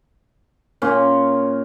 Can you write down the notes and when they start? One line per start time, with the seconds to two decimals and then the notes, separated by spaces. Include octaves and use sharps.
0.82 A#2 C#4